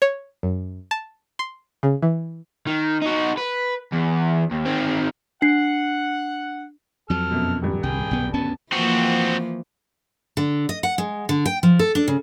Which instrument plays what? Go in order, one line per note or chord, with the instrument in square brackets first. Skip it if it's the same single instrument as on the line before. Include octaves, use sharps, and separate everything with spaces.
[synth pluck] C#5
F#2
A5
C6
C#3
E3
[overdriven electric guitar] D#3
D#4 F#4
B4
E2
D#2
D#3 C4
[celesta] D4 C7 [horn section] F#5
[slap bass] F2 F#3 [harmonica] A4 F6
[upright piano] F#2 B2
D#1 G2
[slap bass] C2 [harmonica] G#4 G5
[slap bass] B1 B3
[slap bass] D2 B3 C#4 [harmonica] A5
[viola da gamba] E3 F3 A#3 [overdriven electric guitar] C4 F#4
[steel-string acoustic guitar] D3
D#5
F#5
G#3
D3
G5
F3
A4
D4
C#3